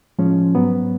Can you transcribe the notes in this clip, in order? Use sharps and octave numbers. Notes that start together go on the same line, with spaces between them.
A2 F3 G#3 C#4
G#2 F#3 B3